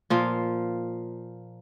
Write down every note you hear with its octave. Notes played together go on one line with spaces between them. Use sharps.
A#2 F3 A#3 F4